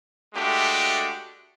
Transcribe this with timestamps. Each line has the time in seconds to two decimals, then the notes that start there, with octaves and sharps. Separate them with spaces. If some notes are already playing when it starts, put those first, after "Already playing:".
0.34 G#3 A3 D4 F#4 G4